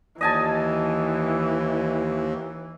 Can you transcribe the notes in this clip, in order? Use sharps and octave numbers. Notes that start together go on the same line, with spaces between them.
D#2 E3 D#5 G#5 A5